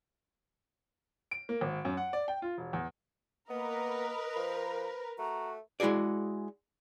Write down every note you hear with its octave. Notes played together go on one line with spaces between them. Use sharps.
D7
A#3
G#1
F#2
F#5
D5
G5
F4
E1
E2
A#3 B3 A#4 B4 D#5
F3 C5
A3 F#4 A#5
G#3 E4 F#4 G#4 D5